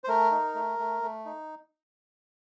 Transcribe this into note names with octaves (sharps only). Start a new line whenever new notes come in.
C5
A3 A#4
D#4
A3
A3
A3
D#4